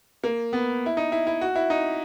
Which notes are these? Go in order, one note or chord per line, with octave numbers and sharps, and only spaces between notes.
A#3
B3
E4
D#4
E4
E4
F#4
E4
D#4